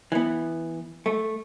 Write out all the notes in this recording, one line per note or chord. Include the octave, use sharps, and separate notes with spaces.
E3 B3
A3